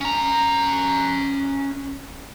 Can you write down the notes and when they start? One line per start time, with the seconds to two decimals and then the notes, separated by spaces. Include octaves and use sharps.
0.01 C#4 A#5